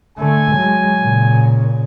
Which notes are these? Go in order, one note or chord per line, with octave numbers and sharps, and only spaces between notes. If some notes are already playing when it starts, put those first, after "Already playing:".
D3 A3 G#5
F#3 G#3
A#2 C#3